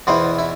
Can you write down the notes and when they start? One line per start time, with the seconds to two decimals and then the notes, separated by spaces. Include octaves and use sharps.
0.07 E2 B2 B3 E4 C5
0.39 E4